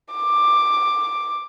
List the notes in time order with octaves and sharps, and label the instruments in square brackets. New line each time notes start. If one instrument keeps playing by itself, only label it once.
[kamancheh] D6